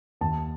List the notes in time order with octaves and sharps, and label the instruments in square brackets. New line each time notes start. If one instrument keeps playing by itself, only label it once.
[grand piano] D#2 A5